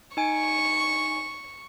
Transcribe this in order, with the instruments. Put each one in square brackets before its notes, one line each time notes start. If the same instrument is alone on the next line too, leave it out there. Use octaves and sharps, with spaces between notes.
[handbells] D#4 G#5 D7 [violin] C#6